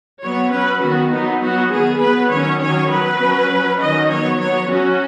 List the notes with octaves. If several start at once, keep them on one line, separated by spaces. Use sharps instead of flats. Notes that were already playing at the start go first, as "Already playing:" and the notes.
F#3 B3 C#5
F#3 C#4 B4
D#3 B3 F#4
F#3 B3 D#4
F#3 B3 F#4
D#3 B3 G#4
F#3 B3 B4
D#3 F#3 C#4 C#5
D#3 F#3 C#4 C#5
F#3 B3 B4
F#3 C#4
F#3 C#4
D#3 F#3 C#4 D#5
F#3 B3 C#5
F#3 B3 C#5
F#3 C#4 F#4